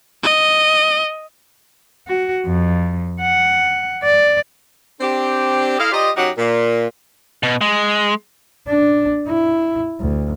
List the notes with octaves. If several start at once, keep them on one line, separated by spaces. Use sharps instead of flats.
D#5
F#4
F2
F#5
D5
C4 D4 G4
E4 A4 D#5 F5
F4 G4 C5 D5 D#5
F#2 F#3 D#4 F#4 G4 F#5
A#2
B2
G#3
D4
E4
D2